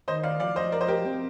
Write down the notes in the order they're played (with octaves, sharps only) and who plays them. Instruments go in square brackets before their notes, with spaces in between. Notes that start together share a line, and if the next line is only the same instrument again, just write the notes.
[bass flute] D#3 [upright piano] C5 D#5
[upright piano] D5 F5
[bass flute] F3 [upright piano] D5 F5
[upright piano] C5 D#5
A#4 D5
C5 D#5
G4 A#4
[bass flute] C4